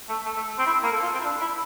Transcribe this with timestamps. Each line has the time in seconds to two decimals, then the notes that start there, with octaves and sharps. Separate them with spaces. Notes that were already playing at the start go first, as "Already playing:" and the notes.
0.09 A3
0.25 A3
0.36 A3
0.58 C4
0.67 E4
0.83 A#3
0.92 A4
1.02 F4
1.14 C4
1.20 E4
1.24 D4
1.41 E4